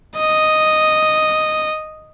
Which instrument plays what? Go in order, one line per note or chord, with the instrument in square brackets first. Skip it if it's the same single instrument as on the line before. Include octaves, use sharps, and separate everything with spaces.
[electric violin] D#5